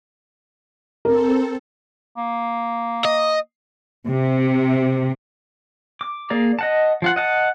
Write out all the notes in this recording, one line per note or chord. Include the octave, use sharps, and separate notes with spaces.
C4 A4 A#4
A#3
D#5
C3
D6
A#3 G#4 D5 A#5
D#5 F#5 A5
F3 F4 F#5
D#5 F#5 A5